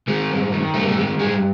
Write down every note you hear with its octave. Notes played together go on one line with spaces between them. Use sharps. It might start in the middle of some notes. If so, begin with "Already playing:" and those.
D#3 G#3
G2
D#3
G2 A3
A#3
A3
D#3 G#3
G2 G#3